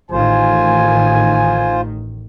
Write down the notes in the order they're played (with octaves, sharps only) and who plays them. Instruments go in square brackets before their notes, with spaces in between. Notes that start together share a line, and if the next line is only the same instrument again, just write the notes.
[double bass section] A1 D#3 [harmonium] F4 C5 [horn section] G#5